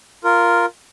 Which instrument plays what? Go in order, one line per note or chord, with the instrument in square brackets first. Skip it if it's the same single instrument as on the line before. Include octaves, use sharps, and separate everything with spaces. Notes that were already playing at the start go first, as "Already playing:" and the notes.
[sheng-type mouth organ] F4 A#4